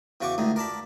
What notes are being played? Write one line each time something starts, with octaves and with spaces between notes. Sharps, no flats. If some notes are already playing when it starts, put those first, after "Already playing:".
E2 C#3 F#4 G5 C#6 D6
C#2 A2 D3 D#4
A#4 D5 A5 B5